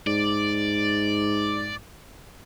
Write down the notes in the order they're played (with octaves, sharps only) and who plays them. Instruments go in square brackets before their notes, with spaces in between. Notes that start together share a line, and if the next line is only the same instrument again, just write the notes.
[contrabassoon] G#2 [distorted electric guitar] D5